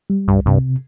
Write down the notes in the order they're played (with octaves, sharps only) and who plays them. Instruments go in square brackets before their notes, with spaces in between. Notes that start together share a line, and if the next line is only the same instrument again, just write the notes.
[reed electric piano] G3
[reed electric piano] C2 [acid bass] G2
[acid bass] G2 [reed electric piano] C3